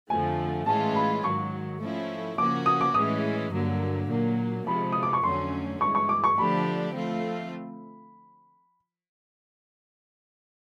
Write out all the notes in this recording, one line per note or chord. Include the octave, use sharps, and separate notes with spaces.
F2 D3 F3 A3 G#5
A2 E3 G#3 C#4 F4 A5
B5
G#2 D#3 F#3 C#6
F3 A3 C#4 E4
C#3 F3 A#3 C#4 F#4 D6
D#6
D6
A2 E3 G#3 C#4 D#6
G2 D3 F#3 A#3
A#2 F#3 A#3
C3 F3 G#3 B5
D#6
D6
C#6
F2 D3 F#3 A3 C#4 C6
G2 E3 G#3 C#6
C#6
D6
C#6
D3 F3 A3 D4 G4 B5
F3 A3 C4 F4